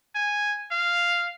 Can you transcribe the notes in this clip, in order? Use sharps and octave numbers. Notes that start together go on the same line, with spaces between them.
G#5
F5